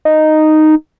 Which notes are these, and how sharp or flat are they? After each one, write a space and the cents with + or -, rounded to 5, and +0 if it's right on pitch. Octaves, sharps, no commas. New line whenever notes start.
D#4 -5